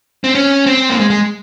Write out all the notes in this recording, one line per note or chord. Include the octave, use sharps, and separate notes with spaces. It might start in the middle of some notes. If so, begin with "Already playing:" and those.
C4
C#4
C4
A#3
G#3
G#3